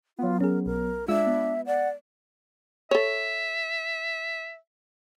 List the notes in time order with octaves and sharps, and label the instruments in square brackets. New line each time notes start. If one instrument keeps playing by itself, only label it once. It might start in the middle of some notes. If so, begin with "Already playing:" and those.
[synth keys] F#3 B3 [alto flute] F4
[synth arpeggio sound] C#4 G#4 [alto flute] A#4
[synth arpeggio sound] B1 [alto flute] A#4
[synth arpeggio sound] G#3 F4 [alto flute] D4 [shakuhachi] E5 [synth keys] E6
[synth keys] B3
[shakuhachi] D5 [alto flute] F#5
[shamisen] A4 C#5 [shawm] E5